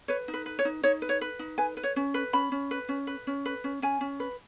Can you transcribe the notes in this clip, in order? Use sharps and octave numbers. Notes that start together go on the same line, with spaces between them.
B4 C#5
D#4
B4
B4
C#5
D#4
D#4 C#5
B4
C#5
B4
D#4
B4 G#5
B4
C#5
C#4
B4
C#4 B5
C#4
B4
C#4
B4
C#4
B4
C#4
C#4 G#5
C#4
B4